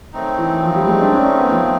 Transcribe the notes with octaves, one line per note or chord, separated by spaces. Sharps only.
D#3 F#3 A3 C4 D#4
E3
F3
G3
G#3
D4
C#4
C#4
B3
F3